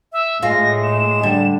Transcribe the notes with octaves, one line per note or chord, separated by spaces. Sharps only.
E5
A2 G#3 F4 A#6
E7
D3 G3